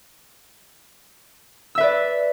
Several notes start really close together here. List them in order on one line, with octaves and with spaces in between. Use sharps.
E6 E5 B4 D5